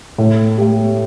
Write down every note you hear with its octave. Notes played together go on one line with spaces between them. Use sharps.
A2
A3 G4